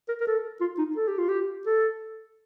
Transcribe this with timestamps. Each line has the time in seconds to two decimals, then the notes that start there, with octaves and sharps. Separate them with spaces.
0.08 A#4
0.21 A#4
0.27 A4
0.61 F4
0.78 D#4
0.96 A4
1.08 G4
1.18 F4
1.29 G4
1.66 A4